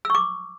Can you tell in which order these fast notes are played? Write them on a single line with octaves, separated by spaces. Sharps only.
E6 C#6 D6